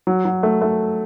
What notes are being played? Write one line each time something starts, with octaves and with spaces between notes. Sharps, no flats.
F#3
F#3
A3
A3